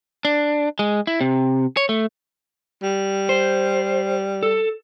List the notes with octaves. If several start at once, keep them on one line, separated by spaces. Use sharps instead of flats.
D4
G#3
E4
C3
C#5
A3
G3
C5
A4